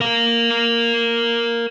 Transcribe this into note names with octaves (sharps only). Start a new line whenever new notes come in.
A#4 F5